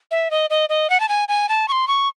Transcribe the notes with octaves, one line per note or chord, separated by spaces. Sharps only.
E5
D#5
D#5
D#5
F#5
A5
G#5
G#5
A5
C#6
C6
C#6